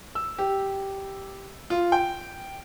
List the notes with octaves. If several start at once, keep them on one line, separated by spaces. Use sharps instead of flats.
E6
G4
F4
G5